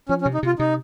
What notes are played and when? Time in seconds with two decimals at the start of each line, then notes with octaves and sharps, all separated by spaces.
0.09 F3 C#4
0.22 C#4
0.26 C3
0.34 D#4
0.43 C3 F4
0.59 C3 D#4